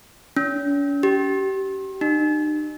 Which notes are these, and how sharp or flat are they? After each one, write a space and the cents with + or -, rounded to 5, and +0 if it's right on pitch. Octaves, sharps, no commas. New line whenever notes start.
C#4 +40
G4 -25
D#4 -40